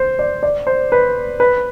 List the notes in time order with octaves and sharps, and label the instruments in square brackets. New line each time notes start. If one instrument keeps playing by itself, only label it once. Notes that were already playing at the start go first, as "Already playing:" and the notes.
Already playing: [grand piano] C5
D5
D5
C5
B4
B4